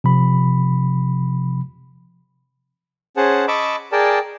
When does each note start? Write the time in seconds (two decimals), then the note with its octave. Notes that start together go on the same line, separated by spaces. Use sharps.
0.04 C3 F3 B5
3.17 C#4 G#4 C5 F#5 A5
3.48 D#5 A5 B5 C#6 D6 E6
3.92 G#4 A#4 D5 G5 A5